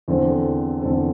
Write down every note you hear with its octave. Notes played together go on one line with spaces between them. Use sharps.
E2 D3 C4 A4 C5
E2 D3 C4 A4 C5